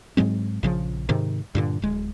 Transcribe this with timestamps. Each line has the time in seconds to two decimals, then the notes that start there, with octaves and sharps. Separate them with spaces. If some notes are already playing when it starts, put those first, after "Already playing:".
0.17 G#2 F#3 G#3 C4
0.63 A#1 C#3 F3
1.09 G#2 C3 D#3
1.55 G2 A#2 D3
1.82 D1 G#3